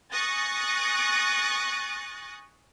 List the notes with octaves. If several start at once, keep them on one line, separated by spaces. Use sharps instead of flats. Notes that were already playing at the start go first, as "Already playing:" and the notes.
G#5 C#6 D#6 F#6 A6 A#6